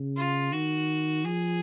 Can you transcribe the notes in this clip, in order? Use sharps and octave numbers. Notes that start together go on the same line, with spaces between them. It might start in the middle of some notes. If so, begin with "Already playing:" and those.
Already playing: C#3
F4
D#3 F#4
F3 G#4